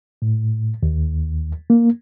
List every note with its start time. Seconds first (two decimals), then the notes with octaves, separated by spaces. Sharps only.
0.22 A2
0.83 D#2
1.70 A#3